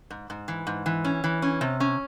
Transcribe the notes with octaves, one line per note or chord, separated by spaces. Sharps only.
G#2
G#2
E3
G#2
E3
C#4
E3
C#4
C3
C#4